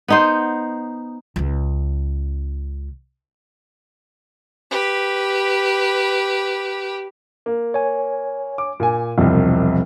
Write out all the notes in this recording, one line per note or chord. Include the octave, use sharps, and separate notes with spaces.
B3 D#4 C5
C#2 C#3
G4 B4
A#3
C#5 G#5
D6
A#2 G#5
E1 C2 F3 G3 C4